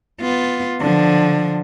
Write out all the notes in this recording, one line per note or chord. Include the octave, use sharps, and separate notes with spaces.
B3 F4
D3 F3